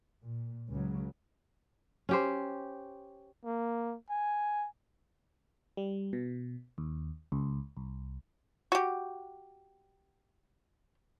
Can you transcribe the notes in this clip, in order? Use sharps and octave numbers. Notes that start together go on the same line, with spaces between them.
A#2
C#2 C#3 F#3
C#4 G4 C5
A#3
G#5
G3
B2
D#2
C#2
C2
F#4 G4